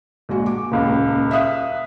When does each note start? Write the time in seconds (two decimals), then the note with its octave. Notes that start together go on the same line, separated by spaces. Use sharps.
0.29 A#1 G#3 F#4
0.46 D6
0.72 D#1 C#2
1.31 E5 F5 D#6 F#6